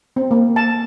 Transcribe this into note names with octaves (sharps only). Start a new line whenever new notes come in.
C4
A#3
A5